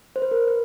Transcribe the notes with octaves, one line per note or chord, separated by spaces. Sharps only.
C5
B4
A#4
B4